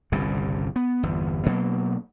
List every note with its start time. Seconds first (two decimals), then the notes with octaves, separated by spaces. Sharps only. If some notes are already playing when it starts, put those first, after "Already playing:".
0.12 G1 C2 G2 C#3
0.76 B3
1.03 G1 E2
1.46 B2 F#3 A#3